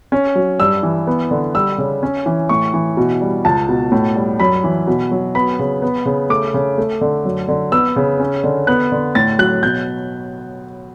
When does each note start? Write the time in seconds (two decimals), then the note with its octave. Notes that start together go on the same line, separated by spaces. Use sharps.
0.12 C#4
0.35 F#3
0.60 G2 E6
0.83 E3
1.07 B3
1.31 D3
1.54 G3 E6
1.78 C#3
2.03 C#4
2.26 E3
2.49 A2 C#6
2.74 E3
2.97 B2
3.21 G3
3.45 C#2 A5
3.69 B2
3.92 A2
4.16 G3
4.40 F#2 B5
4.64 E3
4.87 B2
5.11 F#3
5.35 B3 B5
5.59 C#3
5.82 B3
6.06 C#3
6.29 A3 D6
6.54 C#3
6.78 A3
7.01 D3
7.25 F#2
7.48 D3
7.72 B3 E6
7.96 C#3
8.20 C#4
8.44 D3
8.67 B3 F#6
8.92 D3
9.15 A2 A6
9.39 F#3 F#6
9.63 B2 G6